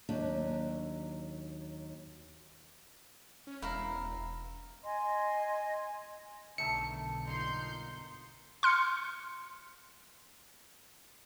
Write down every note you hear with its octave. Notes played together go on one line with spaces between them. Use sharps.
D#2 F#3 D4
C#4
E1 E4 F5 A#5
D#5 G#5 C6
B1 D3 D#3 A3 E5 C#7
G1 A#3 D#4 C6 G6
C6 F6 C#7